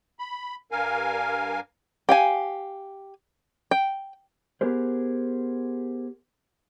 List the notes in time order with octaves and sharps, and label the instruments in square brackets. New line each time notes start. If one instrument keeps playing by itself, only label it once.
[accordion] B5
G2 A#4 F5 G#5
[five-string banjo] G4 F5 G#5
G5
[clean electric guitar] B3 G4 G#4 A#4 C5